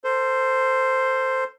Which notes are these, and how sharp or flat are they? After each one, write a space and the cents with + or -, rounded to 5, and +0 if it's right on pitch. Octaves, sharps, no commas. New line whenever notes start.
A4 +30 C5 +0